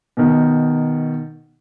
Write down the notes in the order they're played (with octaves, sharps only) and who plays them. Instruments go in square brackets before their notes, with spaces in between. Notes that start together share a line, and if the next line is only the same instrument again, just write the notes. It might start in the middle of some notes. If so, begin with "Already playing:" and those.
[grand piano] B2 D#3